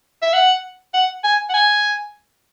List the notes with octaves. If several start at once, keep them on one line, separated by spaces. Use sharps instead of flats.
E5
F#5
F#5
G#5
F#5
G#5